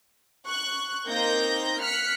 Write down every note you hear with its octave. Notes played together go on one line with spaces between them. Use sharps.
C#6 F#6
A#3 C4 D#4 G6 A#6
F6 F#6 B6 C#7